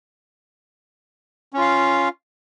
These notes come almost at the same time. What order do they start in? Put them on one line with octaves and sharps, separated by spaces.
C#4 F4 F5